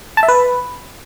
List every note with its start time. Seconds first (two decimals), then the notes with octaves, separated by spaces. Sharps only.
0.17 A5
0.23 E5
0.28 B4